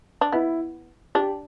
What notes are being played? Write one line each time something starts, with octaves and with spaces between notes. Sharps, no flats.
D4
B3 E4
D4 G4